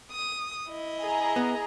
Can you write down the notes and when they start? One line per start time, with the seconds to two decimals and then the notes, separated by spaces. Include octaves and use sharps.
0.11 D#6
0.68 E4 D#5
1.04 G#4 A#5
1.36 B3